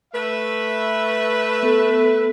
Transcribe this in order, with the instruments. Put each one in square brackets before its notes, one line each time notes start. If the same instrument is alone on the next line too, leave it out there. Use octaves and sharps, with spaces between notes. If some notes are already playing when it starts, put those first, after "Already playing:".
[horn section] A3 B4 E5
[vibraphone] B3 A4